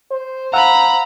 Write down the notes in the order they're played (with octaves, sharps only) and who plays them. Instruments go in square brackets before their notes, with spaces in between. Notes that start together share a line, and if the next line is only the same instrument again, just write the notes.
[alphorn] C5
[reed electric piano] F5 F#5 E6 [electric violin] A#5 B5